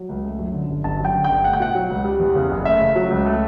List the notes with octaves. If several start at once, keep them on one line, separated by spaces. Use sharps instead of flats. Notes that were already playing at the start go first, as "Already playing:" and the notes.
Already playing: F#3
C#2
A3
F#2
D3
G1
G1 A5
F#2
G5
D3
G5
G1
A3 F#5
G5
B2 F#5
F#3
C#2
G3
E2
C#3
F#1
A3 E5
C#3
F#3
C#2
A3